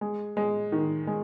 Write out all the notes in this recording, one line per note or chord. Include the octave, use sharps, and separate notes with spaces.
G#3
G#3
D#3
G#3